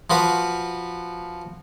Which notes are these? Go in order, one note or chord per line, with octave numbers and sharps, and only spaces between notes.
F3 F4 F#4 B4